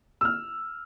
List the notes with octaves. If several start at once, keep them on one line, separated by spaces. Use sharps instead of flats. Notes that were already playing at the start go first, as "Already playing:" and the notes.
E6
F6